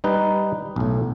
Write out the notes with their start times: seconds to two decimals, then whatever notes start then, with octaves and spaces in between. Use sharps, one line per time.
0.04 G3 D#4 B4
0.76 B1 A2